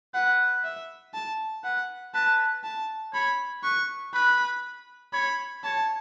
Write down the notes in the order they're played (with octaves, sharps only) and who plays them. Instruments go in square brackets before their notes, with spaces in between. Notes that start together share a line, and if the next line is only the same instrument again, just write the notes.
[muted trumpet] B4 [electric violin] F#5
[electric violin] E5
A5
[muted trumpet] B4 [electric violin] F#5
[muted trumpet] B4 [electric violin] A5
[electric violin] A5
[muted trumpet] C#5 [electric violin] B5
[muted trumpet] B4 [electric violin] C#6
[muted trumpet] B4 [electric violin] B5
[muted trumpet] C#5 [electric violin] B5
[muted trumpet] C#5 [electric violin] A5